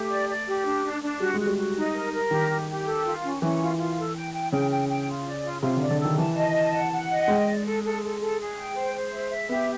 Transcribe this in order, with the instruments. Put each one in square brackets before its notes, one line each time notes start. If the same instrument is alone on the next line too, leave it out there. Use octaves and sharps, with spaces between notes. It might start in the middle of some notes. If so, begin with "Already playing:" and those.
Already playing: [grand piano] A3 [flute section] G4
[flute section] D5
D5
G4
D4
D4
D4
[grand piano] G3 [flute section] F#4
[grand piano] G#3
[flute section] F#4
[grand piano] G3
[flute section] F#4
D#4
A#4
A#4
[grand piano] D#3 [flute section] G4
[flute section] G4
G4
A4
F4
C#4
[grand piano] E3 [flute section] C#4
[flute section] F4
F4
A4
G5
G5
[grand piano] C#3 [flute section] G5
[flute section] G5
G5
F4
D5
F4
[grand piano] C3 [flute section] F4
[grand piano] D3 [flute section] D5
[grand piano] D3
[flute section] A4
[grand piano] D#3
[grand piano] E3 [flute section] A5
[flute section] D#5
A5
F#5
F#5
D#5
[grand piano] G#3 [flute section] G5
[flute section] D5
A4
A4
A4
A4
G#4
G5
C5
C5
E5
E5
[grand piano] B3 [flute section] G4